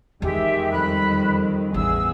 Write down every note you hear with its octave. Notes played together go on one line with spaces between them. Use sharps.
E2 D#3 G#3 G4 E5
F2 G3 B5 F#6
A1 E2 G#4 E6